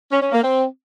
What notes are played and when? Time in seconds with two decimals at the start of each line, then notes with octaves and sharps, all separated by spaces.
0.11 C#4
0.22 C#4
0.32 A#3
0.43 C4